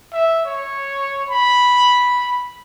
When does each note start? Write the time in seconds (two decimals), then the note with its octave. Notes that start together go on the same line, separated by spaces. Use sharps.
0.13 E5
0.45 C#5
1.29 B5